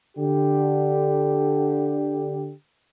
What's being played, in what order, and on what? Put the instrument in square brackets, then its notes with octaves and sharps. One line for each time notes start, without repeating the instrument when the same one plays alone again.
[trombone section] D3 G4